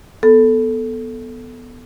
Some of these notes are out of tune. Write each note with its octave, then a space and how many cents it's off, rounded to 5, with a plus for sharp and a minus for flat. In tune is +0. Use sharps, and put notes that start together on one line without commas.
B3 +0 A4 +0